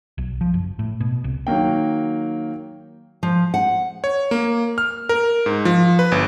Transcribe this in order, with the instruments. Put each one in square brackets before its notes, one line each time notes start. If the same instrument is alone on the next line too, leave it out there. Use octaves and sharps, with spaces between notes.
[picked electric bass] B1
F3
F#1
A2
B2
C2
[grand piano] D#3 F#3 A#3 G5
[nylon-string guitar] F3
F#5
[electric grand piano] C#5
A#3
F6
A#4
G#2
F3
B4
G1